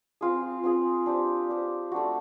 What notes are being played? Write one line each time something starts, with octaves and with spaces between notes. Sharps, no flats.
C4 F4 G#4
C4 F4 G#4
D4 G4 C5
D4 G4 C5
A3 D4 F#4